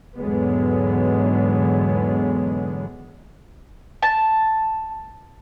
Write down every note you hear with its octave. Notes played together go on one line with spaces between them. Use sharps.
E2 G#2 D3 F#3 G#3 B3
A5